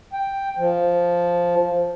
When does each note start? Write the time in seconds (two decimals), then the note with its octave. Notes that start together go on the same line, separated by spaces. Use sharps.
0.13 G5
0.57 F3